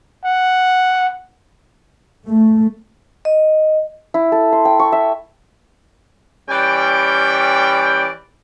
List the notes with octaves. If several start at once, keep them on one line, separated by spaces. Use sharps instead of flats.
F#5
A3
D#5
E4
A4
C6
G5
C#6
E5
E3 G3 C#4 D5 G5